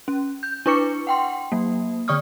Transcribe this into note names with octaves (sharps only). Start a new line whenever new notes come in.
C#4
G6
D4 E4 B4 C#6 D6 C#7
F#5 G5 C6
F#3 A#3
D3 D5 C#6 D#6 F6